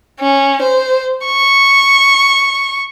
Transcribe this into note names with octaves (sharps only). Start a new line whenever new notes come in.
C#4
C5
C#6